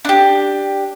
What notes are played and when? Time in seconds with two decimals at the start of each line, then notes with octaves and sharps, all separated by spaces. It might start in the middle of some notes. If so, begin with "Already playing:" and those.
0.05 D4 G4